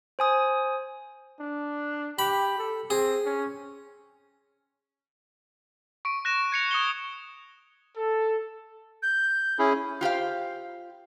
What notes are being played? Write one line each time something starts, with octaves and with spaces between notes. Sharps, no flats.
C5 G#5 D#6
D4
G4 B5
A4
C4 G#4
C#4
C#6 D7
F#6 A#6 E7
G#6 C#7 F7
D#6 C#7 G7
A4
G6
C#4 E4 G#4
F4 G4 C5 F5